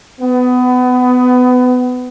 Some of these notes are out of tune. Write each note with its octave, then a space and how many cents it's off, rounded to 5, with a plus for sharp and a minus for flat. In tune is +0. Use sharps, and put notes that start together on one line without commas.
B3 +25